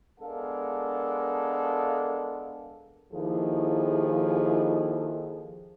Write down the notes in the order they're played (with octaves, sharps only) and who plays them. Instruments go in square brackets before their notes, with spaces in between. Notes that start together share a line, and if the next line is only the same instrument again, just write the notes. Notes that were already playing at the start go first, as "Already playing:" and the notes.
[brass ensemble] G#3 B3 D4 A4 A#4 F5
[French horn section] D#2 D#3 F3 E4 G#4 A4